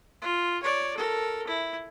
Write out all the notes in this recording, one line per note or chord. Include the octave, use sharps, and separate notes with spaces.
F4
C#5 D5
A4 A#4
E4